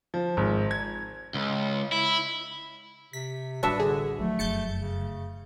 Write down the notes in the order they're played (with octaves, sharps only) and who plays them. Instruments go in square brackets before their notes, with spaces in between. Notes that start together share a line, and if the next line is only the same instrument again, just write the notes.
[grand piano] F3
G#1
G#6
[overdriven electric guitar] C#2
E4
[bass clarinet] C3 [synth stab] B6
[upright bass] A1 G3 [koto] D4 F#4 E5 [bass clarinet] B4
[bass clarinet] D3 [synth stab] G#4
[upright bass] F3 F#3 [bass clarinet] A3
[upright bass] F1 F#2 [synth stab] G6 A6 C#7
[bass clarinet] C#3